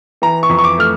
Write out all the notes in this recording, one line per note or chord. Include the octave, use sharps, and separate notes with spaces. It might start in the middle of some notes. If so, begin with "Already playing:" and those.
E3 A#5
C#6
F2
C#6
D6
A3 F6